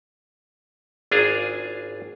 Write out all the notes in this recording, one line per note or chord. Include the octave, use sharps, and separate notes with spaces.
G#1 D4 F4 G#4 G#5 A#5